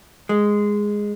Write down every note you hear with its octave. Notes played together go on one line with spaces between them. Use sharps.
G#3